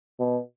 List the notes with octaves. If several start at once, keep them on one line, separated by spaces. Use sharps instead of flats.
B2